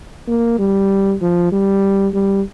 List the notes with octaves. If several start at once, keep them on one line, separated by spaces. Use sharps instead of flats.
A#3
G3
F3
G3
G3